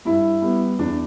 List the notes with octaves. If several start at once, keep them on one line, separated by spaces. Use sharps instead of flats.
G2 E4
G3 B3
E2 D4